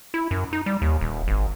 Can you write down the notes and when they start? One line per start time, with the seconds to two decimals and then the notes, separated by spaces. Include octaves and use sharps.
0.14 E4
0.31 F#2
0.53 D#4
0.66 G3
0.82 D#2
1.01 D#1
1.28 G#1